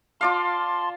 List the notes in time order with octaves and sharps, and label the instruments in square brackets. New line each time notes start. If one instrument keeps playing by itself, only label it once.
[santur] F4 D5 F5 [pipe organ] A5 C6